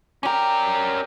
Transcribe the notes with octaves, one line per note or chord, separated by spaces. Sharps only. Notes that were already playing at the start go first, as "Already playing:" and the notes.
C#4 G4 A#4 D5